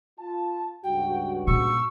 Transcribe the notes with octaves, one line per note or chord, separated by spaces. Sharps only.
F4 A5
C#2 G2 F#4 G5
A#2 C#6 E6